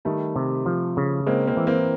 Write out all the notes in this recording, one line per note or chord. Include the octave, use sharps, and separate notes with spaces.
D#3 G3 A3
C3
F3
C#3
G#3 A#3 C4
A#3 C4
E3
A#3 C4